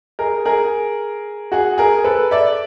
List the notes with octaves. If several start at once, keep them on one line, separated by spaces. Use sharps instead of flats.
G#4 A#4
G#4 A#4
F#4 G#4
G#4 A#4
A4 B4
D5 E5